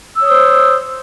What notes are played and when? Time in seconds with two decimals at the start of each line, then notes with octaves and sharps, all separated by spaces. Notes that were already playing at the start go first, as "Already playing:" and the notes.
0.17 E6
0.21 C#5
0.25 D#6
0.29 C5